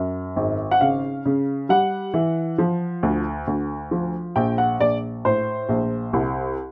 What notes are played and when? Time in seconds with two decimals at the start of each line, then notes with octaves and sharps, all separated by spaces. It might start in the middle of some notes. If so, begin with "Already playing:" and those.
Already playing: F#2
0.36 G#1
0.71 F#5
0.81 C#3 F5
1.26 C#3
1.69 G3 F#5
2.14 E3
2.58 F3
3.03 D2
3.47 D2
3.91 F3
4.36 A#1 G5
4.58 F#5
4.80 A#1 D5
5.25 A2 C5
5.69 A#1
6.13 C2